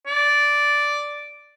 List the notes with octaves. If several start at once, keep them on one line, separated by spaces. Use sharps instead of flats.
D5